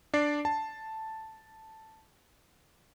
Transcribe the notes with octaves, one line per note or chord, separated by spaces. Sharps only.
D4 D5 C7
A5